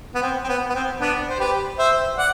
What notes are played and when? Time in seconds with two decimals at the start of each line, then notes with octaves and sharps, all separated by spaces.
0.15 B3
0.22 C4
0.44 C4
0.49 B3
0.70 B3
0.74 C4
1.00 B3 D4
1.29 C5
1.39 G4 B4
1.78 C5 E5
2.17 D5 F#5